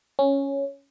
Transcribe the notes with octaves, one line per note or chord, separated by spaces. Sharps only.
C#4